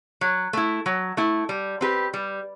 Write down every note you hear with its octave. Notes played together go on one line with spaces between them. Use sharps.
F#3
A3 E4
F#3
A3 E4
G3
C4 G4 B4
G3